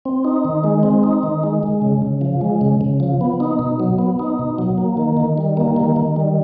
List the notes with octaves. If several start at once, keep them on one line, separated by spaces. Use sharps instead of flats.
C4
D#4
D#3
G#3
C4
D#4
D#3
G#3
G#3
C#3
C#3
F3
G#3
C#3
C#3
F3
B3
D#4
B2
F#3
B3
D#4
B2
F#3
A#3
D#3
D#3
G3
A#3
D#3
D#3
G3